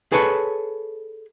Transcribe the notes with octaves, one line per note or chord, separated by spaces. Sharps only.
G#4 A4 B4 C#5